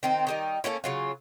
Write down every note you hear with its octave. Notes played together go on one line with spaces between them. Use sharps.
D#3 C4 D#4
D#3 G3 D#4
A3 A#3 C#4 E4
C#3 F#3 F4